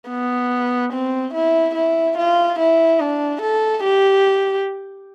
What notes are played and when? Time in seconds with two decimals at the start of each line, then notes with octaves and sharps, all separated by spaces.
0.10 B3
0.93 C4
1.34 E4
1.75 E4
2.18 F4
2.59 E4
3.00 D4
3.42 A4
3.84 G4